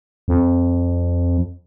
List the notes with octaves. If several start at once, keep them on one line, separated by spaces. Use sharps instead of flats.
F2